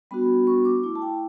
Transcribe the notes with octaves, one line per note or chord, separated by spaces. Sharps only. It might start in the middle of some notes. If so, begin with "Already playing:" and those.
G3 B3 D4 F#4 B5
C#6
D6
A3 E4 D6
A5
G5